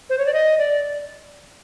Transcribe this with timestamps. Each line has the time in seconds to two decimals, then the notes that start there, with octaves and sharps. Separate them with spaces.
0.10 C5
0.18 C#5
0.26 D5
0.33 D#5
0.58 D5